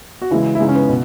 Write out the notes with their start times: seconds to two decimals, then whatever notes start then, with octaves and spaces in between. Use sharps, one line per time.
0.22 F#4
0.31 C#3 E3 G#3 E4
0.55 E4
0.60 C#3 E3 G#3 D#4
0.69 C#4
0.75 B3
0.89 B2